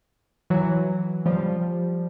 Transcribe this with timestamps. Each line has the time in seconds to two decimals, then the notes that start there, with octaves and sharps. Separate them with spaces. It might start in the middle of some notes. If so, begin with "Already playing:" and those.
0.50 E3 F#3
1.26 F3 G3